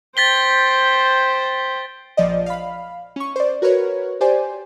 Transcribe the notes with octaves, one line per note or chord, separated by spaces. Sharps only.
C5 G5 A6 B6 G7
A#1 F3 D5 D#5
F5 B5
C#4 C#6
C5 D5
F#4 A#4 B4 C#5
G4 C5 D5 G#5